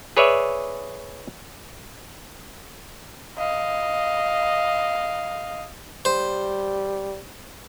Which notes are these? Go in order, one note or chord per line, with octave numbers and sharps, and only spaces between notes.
G#4 B4 C#5 D5 E5
D#5 F5
G3 C5